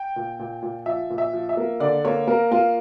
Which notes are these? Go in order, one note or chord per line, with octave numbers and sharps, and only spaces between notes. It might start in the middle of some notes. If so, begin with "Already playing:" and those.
Already playing: G5
A#2
A#2
A#2
F3 E5
A#2
E5
F3
E5
A#3
D3 D5
A#3 C#5
A#3 A#4
A#3 F4